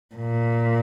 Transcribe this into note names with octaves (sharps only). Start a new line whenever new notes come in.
A#2